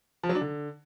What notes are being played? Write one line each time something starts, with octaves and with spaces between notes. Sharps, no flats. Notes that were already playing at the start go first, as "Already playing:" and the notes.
F3
F#3
D4
D3